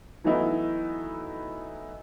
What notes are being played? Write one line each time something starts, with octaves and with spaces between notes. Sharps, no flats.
E3 F#3 A3 B3 D#4 E4